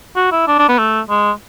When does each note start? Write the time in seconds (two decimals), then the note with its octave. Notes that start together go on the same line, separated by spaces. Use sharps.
0.16 F#4
0.32 E4
0.47 D4
0.59 D4
0.69 B3
0.78 A3
1.09 G#3